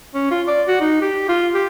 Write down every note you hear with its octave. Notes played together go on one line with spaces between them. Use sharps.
C#4
F4
D5
F#4
D#4
G4
F4
G4